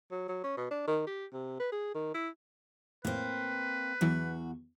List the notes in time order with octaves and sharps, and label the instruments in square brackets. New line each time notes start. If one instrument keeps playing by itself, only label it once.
[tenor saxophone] F#3
F#3
C#4
B2
D4
D#3
G4
C3
B4
G#4
D#3
E4
[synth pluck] A2 [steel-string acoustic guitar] A#3 C4 [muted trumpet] B4
[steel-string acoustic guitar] E2 F#4 [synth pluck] E3 F#3